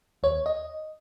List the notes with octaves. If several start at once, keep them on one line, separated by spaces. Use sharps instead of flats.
D#2 C#5
D#5